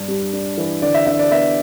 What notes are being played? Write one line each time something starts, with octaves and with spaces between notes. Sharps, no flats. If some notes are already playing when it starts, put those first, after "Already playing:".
Already playing: G2 D4
G3
D4
E3
D3 D5
E5
D3 E5
D5
B3 E5